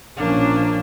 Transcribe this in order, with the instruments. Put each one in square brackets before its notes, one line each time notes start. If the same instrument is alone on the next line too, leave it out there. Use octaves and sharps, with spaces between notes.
[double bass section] A#1 F3 C#4 [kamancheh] A#3 D4